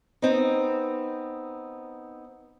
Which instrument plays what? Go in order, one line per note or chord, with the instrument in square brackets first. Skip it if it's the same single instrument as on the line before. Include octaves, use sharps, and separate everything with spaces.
[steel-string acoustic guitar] B3 C4 D#4